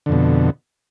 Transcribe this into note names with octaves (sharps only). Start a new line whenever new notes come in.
F2 B2 D3